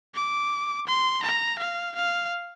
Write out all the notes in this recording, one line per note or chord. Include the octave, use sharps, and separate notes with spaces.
D6
C6
A#5
F5
F5